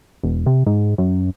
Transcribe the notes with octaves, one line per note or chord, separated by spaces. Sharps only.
E1
C3
G#2
F#2